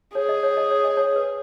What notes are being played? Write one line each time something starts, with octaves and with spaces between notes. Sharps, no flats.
G#4 C#5
D#5
C#5
D#5
C#5
D#5
C#5
B4